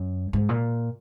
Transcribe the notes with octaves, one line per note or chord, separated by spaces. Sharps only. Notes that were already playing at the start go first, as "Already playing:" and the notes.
Already playing: F#2
G#2
A#2